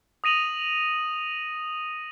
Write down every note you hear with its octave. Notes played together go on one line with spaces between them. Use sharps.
D#6 A#6 D#7 F7 F#7